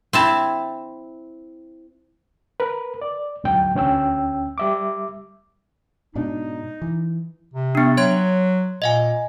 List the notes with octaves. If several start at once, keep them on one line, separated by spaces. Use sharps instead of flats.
C4 E4 A5
A#4 B4
D5
D2 G#2 F#3 G5
D2 C#4 G5 E6
G3 E5 D6
G#2 B2 D4 D#4
E3
C3
B3 D4
F#3 C#5 C6 G#6
A#2 D#5 F5 G#5